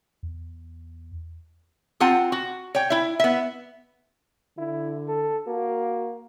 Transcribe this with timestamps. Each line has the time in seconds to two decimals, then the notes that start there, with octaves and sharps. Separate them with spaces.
0.23 E2
2.00 C4 F4 F#5 A5
2.32 F#4
2.75 C#5 G5
2.90 E4 E5
3.19 B3 E5
4.58 D3 E4
5.08 A4
5.47 A#3 F#4